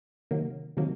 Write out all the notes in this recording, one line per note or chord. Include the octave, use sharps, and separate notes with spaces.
C3 D#3 F#3 A#3
C3 D#3 F#3 A#3